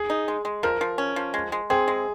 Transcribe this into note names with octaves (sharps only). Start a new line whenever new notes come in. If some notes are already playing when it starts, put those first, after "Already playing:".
Already playing: G#4
D#4
G#3
G#3
F3 A#4
F3
C#4
F3
G#3
G#3
C4 G#4
G#3